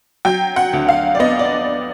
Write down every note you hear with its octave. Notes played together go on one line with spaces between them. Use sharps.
F#3 G5
F#5
D2
F5
D5
B3 D#5
D5